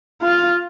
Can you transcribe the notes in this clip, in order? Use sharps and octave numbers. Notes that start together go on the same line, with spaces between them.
F4